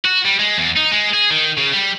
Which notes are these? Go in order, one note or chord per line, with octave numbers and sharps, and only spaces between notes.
F#4
G3
G#3
E2
D#4
G#3
G#4
D#3
C#3
G3